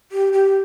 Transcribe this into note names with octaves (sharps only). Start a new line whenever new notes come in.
G4
G4